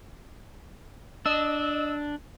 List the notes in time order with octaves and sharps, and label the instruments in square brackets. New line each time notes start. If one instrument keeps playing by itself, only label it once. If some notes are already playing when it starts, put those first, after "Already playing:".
[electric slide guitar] D4 [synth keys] D#5 E6